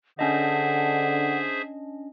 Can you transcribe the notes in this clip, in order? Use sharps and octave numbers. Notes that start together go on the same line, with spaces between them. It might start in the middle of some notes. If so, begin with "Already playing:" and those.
D3 C#4 D4 G#4 C5 D#5 E5 F#5